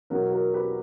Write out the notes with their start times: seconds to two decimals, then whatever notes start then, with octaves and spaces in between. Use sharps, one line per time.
0.10 E2 B2 F#3 F#4 A#4
0.32 F#4 A#4
0.53 G4 B4